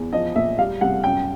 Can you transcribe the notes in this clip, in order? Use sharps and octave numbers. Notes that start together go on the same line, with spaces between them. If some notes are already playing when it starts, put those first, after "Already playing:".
Already playing: E2
F3 D#5
A#2 E5
G3 F5
C2 F#5
F#2 G5